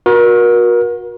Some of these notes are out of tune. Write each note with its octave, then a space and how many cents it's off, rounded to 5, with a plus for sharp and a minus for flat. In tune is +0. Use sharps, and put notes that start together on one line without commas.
F#4 -30 A#4 +35